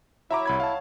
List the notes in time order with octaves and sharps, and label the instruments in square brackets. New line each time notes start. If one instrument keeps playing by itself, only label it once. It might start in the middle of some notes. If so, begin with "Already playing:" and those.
[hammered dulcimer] F#3 [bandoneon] E4 [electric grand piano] E5 A#5 D6
[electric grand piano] C2 B5 G#6
F5 A5